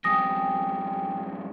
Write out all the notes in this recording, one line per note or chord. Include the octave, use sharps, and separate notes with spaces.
F2 G#2 G5 G#5 D#6 A#6